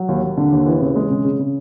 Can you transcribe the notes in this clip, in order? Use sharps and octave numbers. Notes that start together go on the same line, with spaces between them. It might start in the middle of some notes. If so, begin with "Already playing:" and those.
Already playing: F#3
D#2
D#2
D3
D#2
E3
C#3
G#3
C#3
C#3
C#3